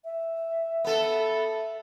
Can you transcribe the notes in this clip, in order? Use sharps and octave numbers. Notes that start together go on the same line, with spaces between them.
E5
B3 A4